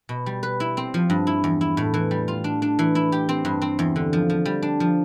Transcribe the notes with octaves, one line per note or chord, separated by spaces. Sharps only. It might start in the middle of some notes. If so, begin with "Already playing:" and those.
B2
G3
B4
E4
C4
F3
G2
E4
E2
E4
A2
E3
G3
F4
D4
D4
E3
E4
G4
C4
G2
C4
E2
D3
F3
F3
G3
D4
F3